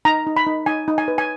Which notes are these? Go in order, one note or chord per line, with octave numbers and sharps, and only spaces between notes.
D#4 A#5
D#4
B5
D#4
D#4 G#5
D#4
G#5
B4
G#5